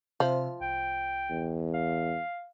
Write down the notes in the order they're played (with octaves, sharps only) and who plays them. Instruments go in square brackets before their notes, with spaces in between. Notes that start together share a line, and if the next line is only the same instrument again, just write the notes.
[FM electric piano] C3 C5 E5 [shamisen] F3
[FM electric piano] C2 [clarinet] G5
[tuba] E2
[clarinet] F5